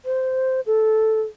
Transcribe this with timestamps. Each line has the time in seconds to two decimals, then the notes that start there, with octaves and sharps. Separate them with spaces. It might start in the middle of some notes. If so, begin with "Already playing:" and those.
0.05 C5
0.66 A4